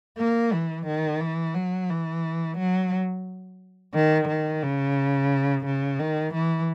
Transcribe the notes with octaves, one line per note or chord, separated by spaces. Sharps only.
A#3
E3
D#3
E3
F#3
E3
F#3
D#3
D#3
C#3
C#3
D#3
E3